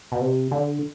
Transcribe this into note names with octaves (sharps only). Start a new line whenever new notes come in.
B2
C3
D3